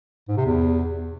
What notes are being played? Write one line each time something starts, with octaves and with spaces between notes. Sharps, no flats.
G#2
C3
E2